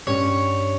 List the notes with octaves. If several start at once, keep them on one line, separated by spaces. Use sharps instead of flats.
G2 G3 C#4 C#5